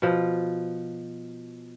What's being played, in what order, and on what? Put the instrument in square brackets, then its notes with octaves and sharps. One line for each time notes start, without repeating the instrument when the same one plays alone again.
[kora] B2 F3